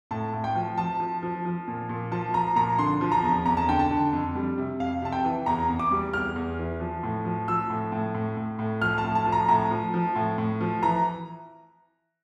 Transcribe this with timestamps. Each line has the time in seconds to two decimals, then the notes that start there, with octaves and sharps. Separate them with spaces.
0.11 A2 A5
0.33 A2
0.44 G5
0.55 F3
0.78 F3 A5
1.00 F3
1.23 F3
1.45 F3
1.68 A#2
1.89 A#2
2.11 F3 A5
2.34 F3 A#5
2.56 A#2 A#5
2.78 D3 C6
3.01 F3
3.12 A#5
3.23 E2
3.46 E2 A#5
3.57 A5
3.69 D3 G5
3.79 A5
3.90 D3
4.13 F2
4.36 G3
4.58 C3
4.80 F2 F5
5.02 C3 A5
5.12 G5
5.25 E3
5.46 E2 A#5
5.69 E2
5.79 D6
5.91 G3
6.13 E2 F6
6.35 E2
6.59 E3
6.80 F3
7.03 A2
7.25 F3
7.48 F3 E6
7.70 A2
7.92 A2
8.14 A2
8.37 A2
8.59 A2
8.82 F3 F6
8.98 A5
9.04 A2
9.15 A5
9.26 F3
9.32 A#5
9.48 A2 A#5
9.71 F3
9.94 F3
10.15 A2
10.38 A2
10.60 F3
10.82 E3 A#5